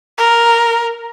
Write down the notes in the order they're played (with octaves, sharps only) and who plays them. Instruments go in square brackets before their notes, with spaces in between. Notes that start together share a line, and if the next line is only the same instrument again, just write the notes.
[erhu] A#4